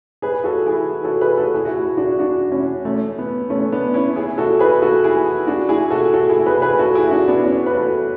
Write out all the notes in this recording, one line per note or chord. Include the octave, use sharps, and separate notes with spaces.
G#4 B4
F#4 A4
E4 G#4
F#4 A4
G#4 B4
F#4 A4
E4 G#4
F#4
E4 G#4
D4 F#4
D4 F#4
C#4 E4
A3 C#4
B3
A3 C#4
B3 D4
C#4 E4
E4 G#4
F#4 A4
G#4 B4
F#4 A4
E4 G#4
D4 F#4
E4 G#4
F#4 A4
F#4 A4
E4 G#4
G#4 B4
G#4 B4
F#4 A4
E4 G#4
D4 F#4
B3 D4
C#4 E4
B4
F#4 A4